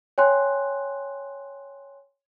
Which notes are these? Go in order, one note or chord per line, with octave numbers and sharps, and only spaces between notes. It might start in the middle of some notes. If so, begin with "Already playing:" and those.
C#5 G5 G#5 C6 F#6